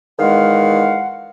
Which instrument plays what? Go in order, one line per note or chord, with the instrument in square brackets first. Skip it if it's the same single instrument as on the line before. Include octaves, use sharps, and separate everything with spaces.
[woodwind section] E2 D#3 G#3 F5 F#5